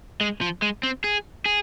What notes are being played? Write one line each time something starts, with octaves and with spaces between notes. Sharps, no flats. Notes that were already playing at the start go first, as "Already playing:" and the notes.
G#3
F3
G#3
C4
G#4
G#4